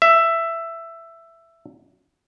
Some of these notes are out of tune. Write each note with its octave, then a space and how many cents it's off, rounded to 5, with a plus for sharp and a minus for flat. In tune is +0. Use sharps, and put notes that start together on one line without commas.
E5 +10